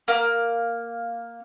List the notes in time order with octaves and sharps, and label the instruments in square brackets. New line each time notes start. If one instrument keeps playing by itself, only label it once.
[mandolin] A#3